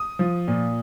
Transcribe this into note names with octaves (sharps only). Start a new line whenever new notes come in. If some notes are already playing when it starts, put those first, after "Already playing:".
Already playing: D#6
F3
A#2